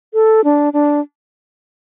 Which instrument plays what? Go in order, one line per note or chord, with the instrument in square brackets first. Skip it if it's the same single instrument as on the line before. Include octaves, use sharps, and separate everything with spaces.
[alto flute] A4
D4
D4